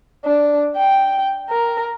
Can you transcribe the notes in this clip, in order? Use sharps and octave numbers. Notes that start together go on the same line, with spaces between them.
D4
G5
A#4